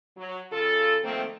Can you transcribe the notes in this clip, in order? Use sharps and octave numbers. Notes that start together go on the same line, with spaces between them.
F#3
C#3 F4 A4
D#3 F3 A3 A#3 C4